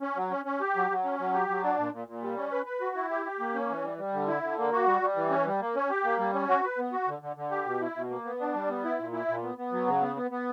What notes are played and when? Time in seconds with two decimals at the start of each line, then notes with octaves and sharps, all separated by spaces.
0.02 C#4
0.16 F#3
0.31 C#4
0.45 C#4
0.61 G4
0.76 F#3
0.90 F#3
1.04 C#4
1.19 F#3
1.34 G4
1.49 F#3
1.63 D4
1.78 A#2
1.93 A#2
2.08 A#2
2.22 G3
2.37 C#4
2.52 B4
2.66 B4
2.81 F#4
2.96 E4
3.11 G4
3.25 G4
3.40 A#3
3.55 C#4
3.69 E3
3.84 G3
3.98 G3
4.13 D3
4.28 E4
4.43 D3
4.58 A#3
4.73 F#4
4.87 G3
5.02 G3
5.16 E3
5.31 C#4
5.46 G3
5.61 A#3
5.76 C#4
5.90 G4
6.05 A#3
6.19 G3
6.34 C#4
6.48 F#4
6.63 B4
6.78 B3
6.93 F#4
7.07 D3
7.22 D3
7.36 D3
7.51 G4
7.66 B2
7.81 E4
7.96 B2
8.10 A#3
8.25 B3
8.40 D4
8.54 G3
8.69 B3
8.84 E4
8.99 A#2
9.13 E4
9.28 A#2
9.43 B3
9.58 B3
9.72 F#3
9.87 C#3
10.02 B3
10.16 B3
10.31 B3